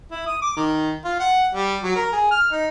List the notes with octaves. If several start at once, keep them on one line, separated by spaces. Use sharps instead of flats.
E4
D#6
D6
D#3
F4
F#5
G3
F#3
A#4
G#4
F6
D#4